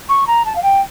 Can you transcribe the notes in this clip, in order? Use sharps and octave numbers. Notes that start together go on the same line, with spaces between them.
C#6
A#5
A5
F5
G5